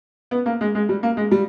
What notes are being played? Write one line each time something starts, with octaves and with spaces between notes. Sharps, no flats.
B3
A#3
G#3
G#3
G3
A#3
G#3
G3